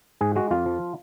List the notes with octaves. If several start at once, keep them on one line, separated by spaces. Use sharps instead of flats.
G#2 G#4
G#3 F#4
F2 F4
F3